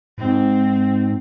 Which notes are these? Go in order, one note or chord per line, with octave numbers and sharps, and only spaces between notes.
G#2 C4